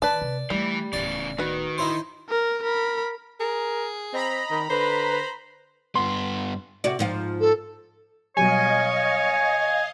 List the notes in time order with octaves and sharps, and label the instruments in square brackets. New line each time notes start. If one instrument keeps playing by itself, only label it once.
[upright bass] D#3 [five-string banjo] B4 A5 [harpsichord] D5
[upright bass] C3
[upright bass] D3 A3 [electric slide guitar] E3 [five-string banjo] G3
[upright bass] D1 B3 [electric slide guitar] C#3 E3 [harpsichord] D5
[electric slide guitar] D#3 [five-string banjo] F#4 B4
[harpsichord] D#4 E4 C5
[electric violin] A#4
A#4 B5
[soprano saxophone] G#4 [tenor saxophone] A#4
[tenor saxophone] C4 [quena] D#5 [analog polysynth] A#5 B5
[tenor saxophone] D#3
[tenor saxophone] D3 [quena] B4 [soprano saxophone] C5
[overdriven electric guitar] G2 B3 [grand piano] C6
[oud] C3 F#4 D5
G#2 F3 F4
[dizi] A4
[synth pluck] B2 F#3 G3 [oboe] C#5 [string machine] D#5 F5 [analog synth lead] G#5